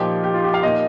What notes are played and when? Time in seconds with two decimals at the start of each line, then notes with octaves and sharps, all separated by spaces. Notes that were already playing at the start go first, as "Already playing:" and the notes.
Already playing: A#2 F3 D#4 G4
0.24 G4
0.34 F4
0.44 G4
0.54 F5
0.63 A#2 A#3 D#4 D#5